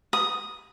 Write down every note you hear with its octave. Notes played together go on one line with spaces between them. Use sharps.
D#6